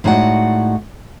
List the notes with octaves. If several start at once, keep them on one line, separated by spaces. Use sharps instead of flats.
A2 G#3 D#4 F#4 D5 F#5